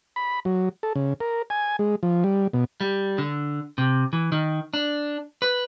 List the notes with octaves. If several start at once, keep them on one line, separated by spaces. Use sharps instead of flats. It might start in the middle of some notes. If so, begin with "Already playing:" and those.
B5
F#3
A4
C#3
A#4
G#5
G#3
F3
G3
B2
G3
D3
C3
E3
D#3
D4
B4